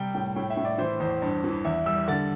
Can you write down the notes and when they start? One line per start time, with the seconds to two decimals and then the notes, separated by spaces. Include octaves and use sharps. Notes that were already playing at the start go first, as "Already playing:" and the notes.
Already playing: C3 G3 G5
0.14 A2 G5
0.36 A2 G5
0.50 E5
0.57 A2
0.65 D5
0.78 E3 C5
1.00 E2 C5
1.22 G2
1.44 E3
1.65 E2 E5
1.86 G3 E6
2.08 D3 A6